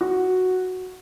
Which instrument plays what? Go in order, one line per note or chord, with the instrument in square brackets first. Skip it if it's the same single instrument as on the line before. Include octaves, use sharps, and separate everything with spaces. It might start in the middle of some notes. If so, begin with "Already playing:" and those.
[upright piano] F#4